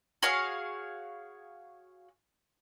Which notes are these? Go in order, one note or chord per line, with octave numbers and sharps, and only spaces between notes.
F#4 G#4 C#5 F5